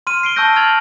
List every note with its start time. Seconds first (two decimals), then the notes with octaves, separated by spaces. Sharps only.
0.07 C6 F6 D#7
0.23 C7 D7 G7
0.36 A5 C#6 E6 F#6 G6 A#6
0.56 F6 G#6 A6 F7 F#7